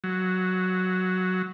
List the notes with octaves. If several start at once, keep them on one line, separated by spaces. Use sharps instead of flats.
F#3